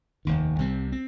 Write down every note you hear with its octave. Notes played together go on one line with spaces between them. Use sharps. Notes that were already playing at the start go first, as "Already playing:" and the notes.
F1 D#2 D#3
C2 C3 G3 C4
C4